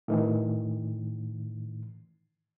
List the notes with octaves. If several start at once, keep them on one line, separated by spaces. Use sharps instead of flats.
A2 D#3 E3